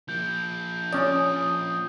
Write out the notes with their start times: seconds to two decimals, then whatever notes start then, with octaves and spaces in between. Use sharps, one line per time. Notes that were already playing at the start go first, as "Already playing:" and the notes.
0.09 F3 A#3 G6
0.93 C#4 D5 D#6